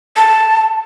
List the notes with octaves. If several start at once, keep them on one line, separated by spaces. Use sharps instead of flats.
A5